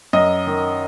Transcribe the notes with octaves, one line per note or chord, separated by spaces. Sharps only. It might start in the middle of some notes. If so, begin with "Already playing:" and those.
F#2 D#5
D#3